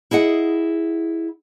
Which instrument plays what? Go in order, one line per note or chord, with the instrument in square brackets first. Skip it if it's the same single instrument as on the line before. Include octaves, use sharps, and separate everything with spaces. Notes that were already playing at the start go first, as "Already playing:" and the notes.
[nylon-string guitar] E4 G#4 D#5 F#5